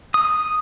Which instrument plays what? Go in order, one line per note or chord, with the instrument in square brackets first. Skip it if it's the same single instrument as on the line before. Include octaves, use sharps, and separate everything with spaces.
[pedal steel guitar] D#6